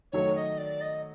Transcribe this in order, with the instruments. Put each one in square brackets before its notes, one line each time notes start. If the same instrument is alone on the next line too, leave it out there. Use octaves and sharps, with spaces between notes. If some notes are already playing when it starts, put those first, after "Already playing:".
[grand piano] D#3 F#3 A3 [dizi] C#5
[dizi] D#5
D5
D#5